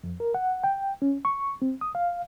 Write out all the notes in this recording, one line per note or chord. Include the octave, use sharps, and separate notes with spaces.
F2
A#4
F#5
G5
C#4
C#6
C4
D#6
F5